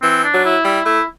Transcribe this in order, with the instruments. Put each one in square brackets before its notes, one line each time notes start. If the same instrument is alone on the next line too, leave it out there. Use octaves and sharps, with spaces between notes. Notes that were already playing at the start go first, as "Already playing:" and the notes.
[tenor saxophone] E3 [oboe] C4
[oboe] D4
[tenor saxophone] F#3
[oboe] E4
[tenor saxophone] G3 [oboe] E4
[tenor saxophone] A3 [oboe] E4